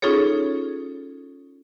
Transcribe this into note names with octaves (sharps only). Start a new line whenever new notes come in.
C#4 D#4 F4 G#4 A4 C#5